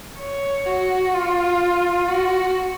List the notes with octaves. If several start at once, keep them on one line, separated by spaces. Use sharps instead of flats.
C#5
F#4
F4
F#4